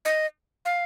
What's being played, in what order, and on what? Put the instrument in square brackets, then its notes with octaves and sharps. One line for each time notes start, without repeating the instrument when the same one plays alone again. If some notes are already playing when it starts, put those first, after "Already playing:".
[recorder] D#5
F5